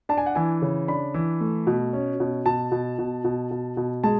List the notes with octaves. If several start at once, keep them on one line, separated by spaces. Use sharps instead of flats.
D4 A5
G#5
F#5
E3 G#5
C#3
D4 B5
E3
A3
B2
C#4
B2
B2 A5
B2
B2
B2
B2
B2
G#3 A5